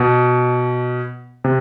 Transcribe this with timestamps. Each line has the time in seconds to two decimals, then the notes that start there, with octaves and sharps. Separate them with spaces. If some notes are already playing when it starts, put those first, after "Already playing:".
Already playing: B2
1.44 C3